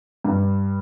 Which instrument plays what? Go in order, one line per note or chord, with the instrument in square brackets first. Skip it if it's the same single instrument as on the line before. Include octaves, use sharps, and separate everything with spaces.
[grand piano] G2